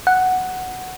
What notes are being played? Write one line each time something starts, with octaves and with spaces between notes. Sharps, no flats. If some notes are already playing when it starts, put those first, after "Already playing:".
F#5